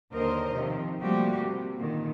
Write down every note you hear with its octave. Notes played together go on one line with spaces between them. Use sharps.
D#2 D3 A#4 C5 D#5
C3 D#3 F3
F3 G3 A3 A#3 F#4 G4
C3
A#2 D3 D#3